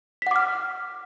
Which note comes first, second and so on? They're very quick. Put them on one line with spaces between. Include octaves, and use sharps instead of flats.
B6 F#5 D6 F6